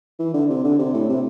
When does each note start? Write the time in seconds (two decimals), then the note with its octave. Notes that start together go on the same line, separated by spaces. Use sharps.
0.19 E3
0.34 D3
0.49 C3
0.64 D3
0.79 C3
0.94 A2
1.09 C3